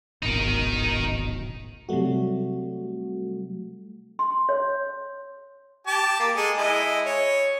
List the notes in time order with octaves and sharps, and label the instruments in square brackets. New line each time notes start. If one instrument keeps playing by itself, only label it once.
[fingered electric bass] D1 G#1 B2 [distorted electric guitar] D#4 A#4
[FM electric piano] C3 F#3 G3 A3 F#4
[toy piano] C6
C#5
[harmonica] G4 A5 D6
A#3
G#3 G#4 A4
G#3 E4 D#5
C#5